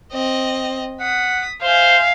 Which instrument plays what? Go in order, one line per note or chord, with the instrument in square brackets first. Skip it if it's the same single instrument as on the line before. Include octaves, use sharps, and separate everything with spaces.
[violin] C4 D#5
[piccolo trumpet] F#5 [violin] D#6 B6
[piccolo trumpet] C5 [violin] E5 G#5 [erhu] F5